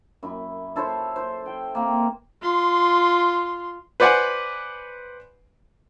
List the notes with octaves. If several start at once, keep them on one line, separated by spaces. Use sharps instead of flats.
F#2 E4
E4 A4 C5 C#5
C5
G5
A#3 C4
F4 C6
B4 C5 D5 F#5 G#5